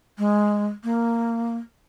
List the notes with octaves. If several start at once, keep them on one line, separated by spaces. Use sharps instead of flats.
G#3
A#3